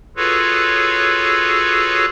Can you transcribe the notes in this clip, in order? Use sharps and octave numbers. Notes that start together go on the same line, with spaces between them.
F4 F#4 G#4 A4 B4 C#5